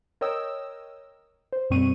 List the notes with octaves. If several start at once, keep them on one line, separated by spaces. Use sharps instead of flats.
A#4 C#5 D#5 G5 D#6 E6
C5
F#2 B2 G3 C4 C#6 D#7